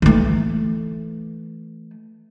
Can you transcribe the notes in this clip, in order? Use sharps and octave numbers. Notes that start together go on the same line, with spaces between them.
E3 A3